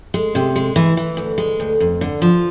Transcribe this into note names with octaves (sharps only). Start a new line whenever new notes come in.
G#3
C3
G#3
E3
E3
D2
G#3
D2
F2
D3
F3